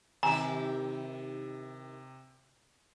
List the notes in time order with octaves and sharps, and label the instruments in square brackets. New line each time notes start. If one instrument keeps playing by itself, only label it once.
[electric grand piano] C3 [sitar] D#3 E4 G4 [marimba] G#5 [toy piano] A#5